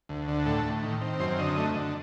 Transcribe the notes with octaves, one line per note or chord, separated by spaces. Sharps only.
D2
D3
A2 A4
A2
D#3
C4
F#2 C5
D3 D#5
A3
D3